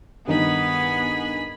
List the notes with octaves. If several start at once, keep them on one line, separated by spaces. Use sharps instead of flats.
G2 D#3 B3 D#4 G#4 B5